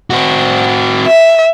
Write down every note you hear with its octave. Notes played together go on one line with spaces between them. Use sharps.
C4 F#4
E5